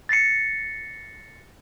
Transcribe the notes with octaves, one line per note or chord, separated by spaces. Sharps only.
A6 A#6 C7 C#7